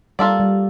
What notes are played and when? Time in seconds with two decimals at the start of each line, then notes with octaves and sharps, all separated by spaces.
0.19 G3 A#3 D4 F4 A4 D5
0.40 G3